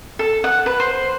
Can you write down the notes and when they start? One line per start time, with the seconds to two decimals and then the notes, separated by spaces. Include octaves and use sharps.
0.19 A4
0.44 F#5
0.66 B4
0.80 C5